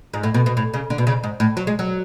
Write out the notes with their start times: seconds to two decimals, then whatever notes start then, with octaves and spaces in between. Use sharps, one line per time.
0.14 G#2
0.23 A2
0.34 B2
0.46 B2
0.57 A2
0.74 C#3
0.90 D3
0.98 B2
1.07 C#3
1.24 G#2
1.40 A2
1.57 F#3
1.67 G#3
1.79 F#3